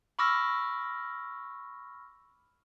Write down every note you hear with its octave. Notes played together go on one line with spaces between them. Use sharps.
B5 C#6 D6 E6 F6 A#6